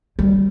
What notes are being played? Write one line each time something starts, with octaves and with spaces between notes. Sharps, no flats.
G3